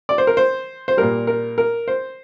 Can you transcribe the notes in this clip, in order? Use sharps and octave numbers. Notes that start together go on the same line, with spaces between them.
D5
C5
A#4
C5
C5
A#2 G3 A#4
A#4
A#4
C5